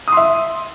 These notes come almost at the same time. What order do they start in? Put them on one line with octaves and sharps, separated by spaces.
D#6 C6 E5